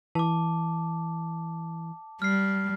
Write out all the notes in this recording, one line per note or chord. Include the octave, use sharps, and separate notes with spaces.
E3 A5 D6
G3 F6 C7